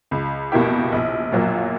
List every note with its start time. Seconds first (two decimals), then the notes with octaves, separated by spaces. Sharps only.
0.11 C#2
0.52 B2 A#3 E4 G4
0.92 A#1
1.32 A#2 F#3 A#3